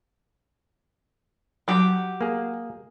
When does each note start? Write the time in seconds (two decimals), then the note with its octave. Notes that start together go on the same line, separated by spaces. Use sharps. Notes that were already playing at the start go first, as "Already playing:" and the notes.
1.68 F#3 G4
2.21 A#3 G#4